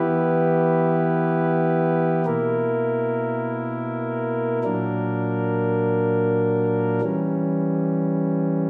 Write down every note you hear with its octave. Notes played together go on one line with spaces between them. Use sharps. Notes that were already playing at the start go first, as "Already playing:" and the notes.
Already playing: E3 B3 E4 G4 B4
B2 A#3 E4 A#4
A#2 F#3 A#3 D4 A#4
E3 G3 C#4